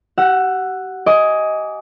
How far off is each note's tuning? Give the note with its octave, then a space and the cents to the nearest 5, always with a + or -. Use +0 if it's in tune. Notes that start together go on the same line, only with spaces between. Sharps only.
G4 -40 F#5 +0 E6 +20
D#5 +15 G#5 +0 D6 -15